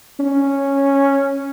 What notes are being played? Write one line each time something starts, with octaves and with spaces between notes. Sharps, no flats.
C#4